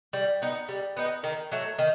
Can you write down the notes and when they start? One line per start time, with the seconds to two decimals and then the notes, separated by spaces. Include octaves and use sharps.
0.13 G3
0.42 B3 D#4
0.69 G3
0.96 B3 D#4
1.23 D#3
1.52 F#3 A3
1.78 D#3